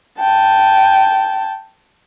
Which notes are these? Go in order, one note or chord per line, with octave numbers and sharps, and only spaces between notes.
G5 A5